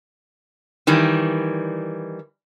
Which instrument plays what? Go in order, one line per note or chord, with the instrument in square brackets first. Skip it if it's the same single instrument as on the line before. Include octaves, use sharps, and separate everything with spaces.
[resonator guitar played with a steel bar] D#3 E3 G3